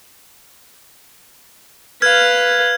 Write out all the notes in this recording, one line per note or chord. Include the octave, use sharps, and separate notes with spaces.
B4 F5 F6 G#6